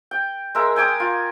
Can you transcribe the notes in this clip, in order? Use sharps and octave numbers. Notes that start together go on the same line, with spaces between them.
G5
G#3 A#4 E5
G5 G#5 D6 D#6
F4